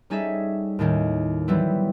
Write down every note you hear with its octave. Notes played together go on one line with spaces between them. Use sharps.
G3 C#4 D#4 G#4 A4 E5
D#2 A2 D#3 C#4
E3 F#3 G3 B3 C4 E4